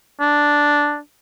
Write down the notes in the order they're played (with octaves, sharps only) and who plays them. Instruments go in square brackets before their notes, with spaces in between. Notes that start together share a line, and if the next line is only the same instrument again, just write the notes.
[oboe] D4